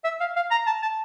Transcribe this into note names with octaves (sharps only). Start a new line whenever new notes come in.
E5
F5
F5
A#5
A5
A5